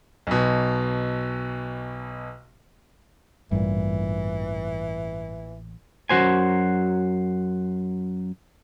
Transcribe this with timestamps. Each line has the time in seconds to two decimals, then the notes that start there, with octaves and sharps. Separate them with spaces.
0.27 B1 B2
3.51 A1 G2 A#2 E3
6.09 F#2 F#4 C5 G#5